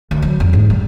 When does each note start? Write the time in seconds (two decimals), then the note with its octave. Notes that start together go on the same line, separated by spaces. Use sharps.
0.11 D2
0.22 F#3
0.40 F2
0.53 G#2
0.70 G3